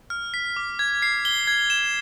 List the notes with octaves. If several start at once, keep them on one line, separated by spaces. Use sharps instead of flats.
F6
B6
D6
G#6
C7
G7
G#6
E7